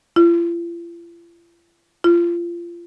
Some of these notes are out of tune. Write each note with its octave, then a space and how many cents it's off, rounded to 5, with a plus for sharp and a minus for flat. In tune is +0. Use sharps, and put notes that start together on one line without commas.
F4 -45
F4 -25